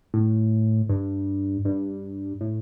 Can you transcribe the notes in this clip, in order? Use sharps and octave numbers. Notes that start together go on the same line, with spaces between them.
A2
G2
G2
A2